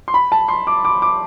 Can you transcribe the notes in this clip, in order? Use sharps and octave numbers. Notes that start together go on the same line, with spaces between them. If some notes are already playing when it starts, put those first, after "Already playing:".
C6
B5
A5
C6
D6
D6
D6